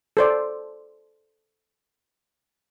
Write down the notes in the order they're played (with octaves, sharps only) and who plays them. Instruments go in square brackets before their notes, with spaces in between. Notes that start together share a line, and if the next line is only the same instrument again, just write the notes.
[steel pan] A4 C5 D5